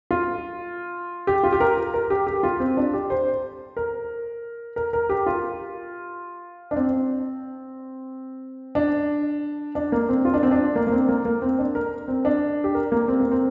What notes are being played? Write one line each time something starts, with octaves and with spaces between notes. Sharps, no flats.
F4
G4
F4
G4
A#4
A#4
G4
G4
F4
C4
D4
G4
C5
A#4
A#4
A#4
G4
F4
D4
C4
D4
D4
A#3
C4
F4
D4
C4
D4
A#3
A#3
C4
A#3
A#3
C4
D4
A#4
C4
D4
G4
A#4
A#3
C4
A#3
C4